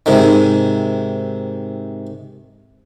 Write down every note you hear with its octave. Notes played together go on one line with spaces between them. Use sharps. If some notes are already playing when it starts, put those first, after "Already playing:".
G#2 C3 D#3